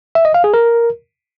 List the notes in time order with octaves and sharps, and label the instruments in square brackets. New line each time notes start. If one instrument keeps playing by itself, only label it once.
[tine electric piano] E5
D#5
F5
G#4
A#4